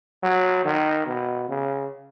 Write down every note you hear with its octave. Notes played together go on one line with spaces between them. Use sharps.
F#3
D#3
B2
C#3